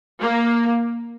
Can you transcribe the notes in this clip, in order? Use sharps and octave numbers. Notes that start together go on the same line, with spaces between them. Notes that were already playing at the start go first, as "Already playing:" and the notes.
A#3